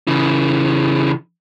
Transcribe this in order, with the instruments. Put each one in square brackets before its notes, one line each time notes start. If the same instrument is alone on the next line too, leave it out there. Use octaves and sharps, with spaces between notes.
[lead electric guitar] C#3 E3